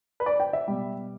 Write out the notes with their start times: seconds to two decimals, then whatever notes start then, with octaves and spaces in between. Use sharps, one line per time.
0.20 B4
0.26 D5
0.40 G5
0.53 E5
0.67 B2 G3